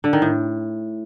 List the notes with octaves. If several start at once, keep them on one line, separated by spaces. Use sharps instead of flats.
D3
D#3
A2